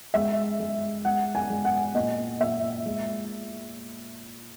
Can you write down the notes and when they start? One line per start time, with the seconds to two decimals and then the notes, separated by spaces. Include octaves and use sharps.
0.14 G#3 E5
0.60 G#3
1.05 G#3 F#5
1.35 G#5
1.50 G#3
1.65 F#5
1.95 A#2 D#5
2.41 A#2 E5
2.86 G#3